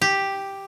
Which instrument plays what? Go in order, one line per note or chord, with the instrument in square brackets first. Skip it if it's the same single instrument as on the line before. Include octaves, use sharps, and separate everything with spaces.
[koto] G4